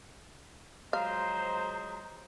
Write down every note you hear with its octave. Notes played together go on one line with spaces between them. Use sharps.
F3 F#3 G#3 C5 F5 A#5